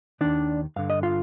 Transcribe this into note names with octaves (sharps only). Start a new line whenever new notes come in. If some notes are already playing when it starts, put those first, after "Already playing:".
D#2 D#3 D4 D5
G2 D3 F5
D#5
F4 F5